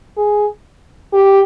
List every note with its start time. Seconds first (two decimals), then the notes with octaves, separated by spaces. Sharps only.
0.18 G#4
1.13 G4